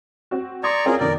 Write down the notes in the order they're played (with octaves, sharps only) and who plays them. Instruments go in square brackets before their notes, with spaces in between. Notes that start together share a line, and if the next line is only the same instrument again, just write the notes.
[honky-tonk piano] C4 F#4
[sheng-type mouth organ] D5 A#5 C#6 [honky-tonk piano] C6 D#6 G#6
[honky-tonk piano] C4 C#4 F4 [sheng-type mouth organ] G#4 A#4
[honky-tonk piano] F2 B2 D#3 [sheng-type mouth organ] A#4 D5